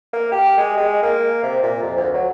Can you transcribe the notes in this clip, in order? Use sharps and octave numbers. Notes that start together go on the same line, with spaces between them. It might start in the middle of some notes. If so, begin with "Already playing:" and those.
A#3
G4
G#3
G#3
A#3
C3
A#2
F2
D2
F#3